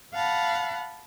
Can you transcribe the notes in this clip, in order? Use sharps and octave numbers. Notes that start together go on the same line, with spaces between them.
F5 F#5 A5 B5